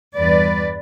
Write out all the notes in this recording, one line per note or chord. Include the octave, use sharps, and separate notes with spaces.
E2 G2 B4 D5